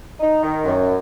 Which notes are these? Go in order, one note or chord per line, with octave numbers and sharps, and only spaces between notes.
D#4
D#3
F#2